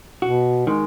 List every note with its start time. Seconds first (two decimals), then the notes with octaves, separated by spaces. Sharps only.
0.22 B2 F#4
0.67 D#3 G#3